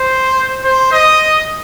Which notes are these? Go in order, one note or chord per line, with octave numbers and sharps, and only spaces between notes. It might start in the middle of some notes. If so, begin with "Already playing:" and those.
Already playing: C5
C5
D#5